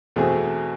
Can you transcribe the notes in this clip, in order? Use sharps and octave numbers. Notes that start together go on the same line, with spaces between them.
E2 B2 A3 C4 G#4